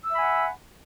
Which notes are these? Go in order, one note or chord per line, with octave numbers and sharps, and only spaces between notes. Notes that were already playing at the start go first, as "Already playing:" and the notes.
E5 F#5 G#5 B5 E6